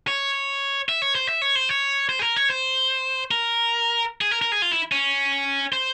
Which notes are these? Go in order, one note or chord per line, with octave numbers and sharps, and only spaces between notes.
C#5
E5
C#5
C5
E5
C#5
C5
C#5
C5
G#4
A#4
C#5
C5
A#4
G#4
A#4
A#4
G#4
F4
E4
C#4
C5